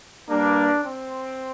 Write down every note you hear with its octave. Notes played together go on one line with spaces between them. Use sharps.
G2 G3 A#3 D4
C4